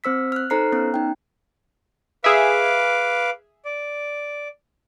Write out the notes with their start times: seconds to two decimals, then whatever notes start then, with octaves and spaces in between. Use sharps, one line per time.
0.04 C4 C5 E6 B6
0.32 F6 F#6
0.50 D#4 A4 C5 A#5 F6 C7
0.72 B3 C#4 A#5 F#6
0.94 D#4 G5
2.24 G#4 B4 E5 F5 D6
3.65 D5